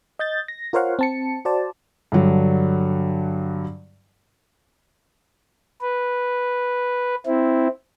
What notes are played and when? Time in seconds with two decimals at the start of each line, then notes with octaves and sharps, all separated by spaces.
0.19 D#5 G6 A6
0.48 A#6
0.73 F4 A#4 C5 C#5 F5 F#5
0.99 C4 A5 C#7
1.45 F#4 C5 D5 A5
2.12 G2 D3 F#3
5.81 B4
7.26 C4 E4